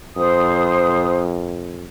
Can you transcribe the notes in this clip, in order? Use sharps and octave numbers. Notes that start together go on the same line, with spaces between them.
F2 C5 D#6